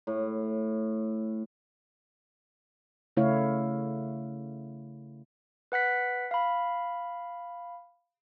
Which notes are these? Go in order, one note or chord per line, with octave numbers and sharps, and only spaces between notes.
A2
C#3 A3 E4 C#5 F5
B4 F#5 F#6 B6
F5 B5